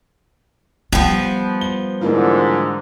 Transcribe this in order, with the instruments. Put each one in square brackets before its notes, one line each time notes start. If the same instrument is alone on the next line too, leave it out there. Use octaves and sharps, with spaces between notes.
[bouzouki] F3 B3 [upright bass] G3 [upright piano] G5
[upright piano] G7
[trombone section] G#2 D3 [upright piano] E3 A#3 F4